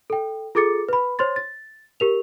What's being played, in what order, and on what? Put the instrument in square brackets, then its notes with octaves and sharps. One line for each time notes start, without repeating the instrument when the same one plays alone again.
[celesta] A4 G5
F4 G#4 A4 D6 A6 C#7
B4 B5
C5 C#5 C6 A6
A6
G4 A#4 F7